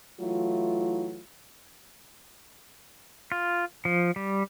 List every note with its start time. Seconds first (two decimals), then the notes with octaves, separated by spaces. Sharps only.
0.21 E3 F#3 A3 E4 F4
3.32 F4
3.85 F3
4.16 G3